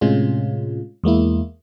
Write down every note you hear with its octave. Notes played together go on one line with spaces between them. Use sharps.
A2 C3 G#3 C#4 F4
E2 G#3 A#3 E4